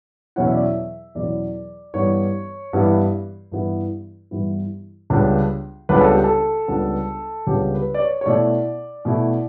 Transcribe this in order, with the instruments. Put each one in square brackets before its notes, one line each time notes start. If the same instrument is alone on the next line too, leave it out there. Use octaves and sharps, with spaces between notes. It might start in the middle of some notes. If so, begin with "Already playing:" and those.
[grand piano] E2 B2 F#3 C#4 E4 F#5
E5
D5
E5
E2 B2 F#3 C#4 E4 D5
G2 E3 G3 B3 E4 C#5
G2 E3 G3 B3 E4
G2 E3 G3 B3 E4
G2 E3 G3 B3 E4
C#2 C#3 G3 B3 D4
C#2 C#3 G3 B3 D4 B4
A4
G4
A4
C#2 C#3 G3 B3 D4
C#2 C#3 G3 B3 D4 G4
B4
D5
C#5
C#5
B2 A3 E4 D5
B2 A3 E4